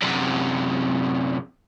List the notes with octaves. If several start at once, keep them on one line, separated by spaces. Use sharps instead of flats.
F#2 C3